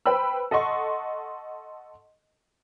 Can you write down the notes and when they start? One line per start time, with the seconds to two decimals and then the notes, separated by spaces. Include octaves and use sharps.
0.06 B4 C5 G5 B5 E6
0.51 A4 D#5 F#5 C6 C#6